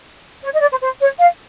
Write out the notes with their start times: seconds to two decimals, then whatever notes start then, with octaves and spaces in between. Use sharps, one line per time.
0.43 C#5
0.54 D#5
0.62 D5
0.71 C5
0.82 C5
1.01 C#5
1.19 F5